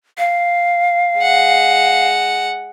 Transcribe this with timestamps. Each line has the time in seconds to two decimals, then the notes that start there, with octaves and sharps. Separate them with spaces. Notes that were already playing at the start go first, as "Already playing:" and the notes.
0.18 F5
1.19 G#3 F#5